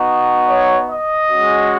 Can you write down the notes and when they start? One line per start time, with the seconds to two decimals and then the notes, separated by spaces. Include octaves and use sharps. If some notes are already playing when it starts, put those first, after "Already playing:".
Already playing: B3 D#4 F#4
0.47 C#5
0.88 D#5
1.29 G#3 C#4 F#4